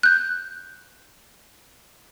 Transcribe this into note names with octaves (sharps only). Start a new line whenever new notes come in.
F#6 G6